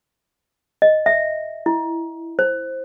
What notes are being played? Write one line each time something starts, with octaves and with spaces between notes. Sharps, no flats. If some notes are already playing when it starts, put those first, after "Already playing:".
D#5
E5
E4
C5